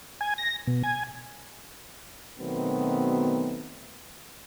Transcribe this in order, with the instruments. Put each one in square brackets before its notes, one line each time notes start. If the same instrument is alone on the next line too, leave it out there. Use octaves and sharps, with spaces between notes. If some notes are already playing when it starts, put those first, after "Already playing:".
[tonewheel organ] G#5
A#6
B2
G#5
[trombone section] B2 D#3 F#3 A3 B3 C4